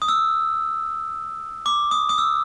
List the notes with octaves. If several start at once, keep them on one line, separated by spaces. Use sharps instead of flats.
D#6
E6
D6
D#6
D#6
E6